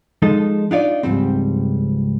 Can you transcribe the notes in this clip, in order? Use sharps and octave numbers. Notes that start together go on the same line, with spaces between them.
F3 G#3 D#4 A4
D4 D#4 F4 D5
C#2 G#2 F3 G3 C4